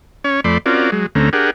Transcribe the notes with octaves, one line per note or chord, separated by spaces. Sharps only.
C#4 C#5
F2 A3 D5 B5 C6
C4 C#4 F4 F#4 A#4 D5
F#3 G#3
D2 D3 A3 C4 C#4 A#5
D4 G4 G#4 A#4 F#5